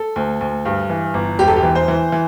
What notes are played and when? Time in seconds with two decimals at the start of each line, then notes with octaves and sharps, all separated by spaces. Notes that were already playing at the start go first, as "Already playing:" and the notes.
Already playing: A4
0.16 D2
0.41 D2
0.65 G2
0.90 E3
1.14 G1
1.39 E1 G4
1.48 A4
1.56 G4
1.63 E3
1.75 C5
1.88 E3
2.12 E3